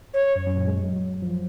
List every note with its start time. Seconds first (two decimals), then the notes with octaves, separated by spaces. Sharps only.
0.14 C#5
0.36 F#2
0.46 F#2
0.56 A#2
0.67 G#3
0.78 F#3
1.22 F3